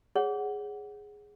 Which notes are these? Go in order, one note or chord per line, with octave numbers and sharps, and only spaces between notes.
G#4 C#5 F#5